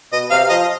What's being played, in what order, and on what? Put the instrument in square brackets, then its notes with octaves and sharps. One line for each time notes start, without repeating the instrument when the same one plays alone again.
[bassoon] B2 [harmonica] D#5
[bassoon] C3 [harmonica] F5
[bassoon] F3 [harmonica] D#5